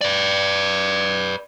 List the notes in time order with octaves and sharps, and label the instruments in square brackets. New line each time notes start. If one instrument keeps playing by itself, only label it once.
[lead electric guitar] B4 D5